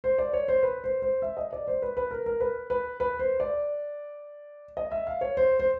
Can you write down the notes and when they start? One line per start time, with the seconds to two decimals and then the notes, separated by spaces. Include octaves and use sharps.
0.04 C5
0.19 D5
0.33 C#5
0.48 C5
0.63 B4
0.84 C5
1.02 C5
1.22 E5
1.37 D#5
1.53 D5
1.68 C5
1.82 B4
1.97 B4
2.11 A#4
2.26 A#4
2.40 B4
2.70 B4
3.00 B4
3.19 C5
3.40 D5
4.77 D#5
4.92 E5
5.07 F5
5.21 C#5
5.37 C5
5.60 C5